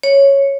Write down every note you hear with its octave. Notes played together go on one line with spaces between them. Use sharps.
C#5